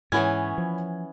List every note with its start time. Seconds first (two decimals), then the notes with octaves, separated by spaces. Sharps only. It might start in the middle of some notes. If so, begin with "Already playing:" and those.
0.12 G#2 E3 B3 C#4 E4 C#5 G#6
0.58 F3